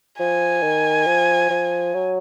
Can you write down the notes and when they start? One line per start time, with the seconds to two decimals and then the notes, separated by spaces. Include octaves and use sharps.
0.19 F3 G#5
0.62 D#3
1.07 F3
1.50 F3
1.94 F#3